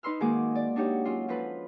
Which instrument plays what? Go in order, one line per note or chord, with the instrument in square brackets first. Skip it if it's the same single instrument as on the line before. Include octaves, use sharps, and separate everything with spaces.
[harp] D#4 B4 B5 C6 E6 F6
D#3 G#3 A#3 F#4 G#4 D6
D5
D4 D#4 F#4 G4 C#5
F#3 C#4 F4
F3 F4 A4 B4